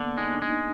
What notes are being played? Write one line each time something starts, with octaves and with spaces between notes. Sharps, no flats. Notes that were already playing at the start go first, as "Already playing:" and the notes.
Already playing: D3 A#3 B3
G#3 D#4
D4
G#3
D#4